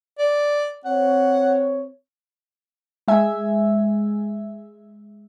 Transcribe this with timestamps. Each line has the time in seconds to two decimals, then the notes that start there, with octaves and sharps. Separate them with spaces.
0.19 D5
0.85 C4 C#5 F#5
3.08 G#3 E5 G#5